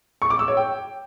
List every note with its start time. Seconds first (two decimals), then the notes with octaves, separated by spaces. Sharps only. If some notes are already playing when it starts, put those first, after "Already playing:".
0.22 C#6
0.30 D6
0.39 E6
0.48 C#5
0.57 G5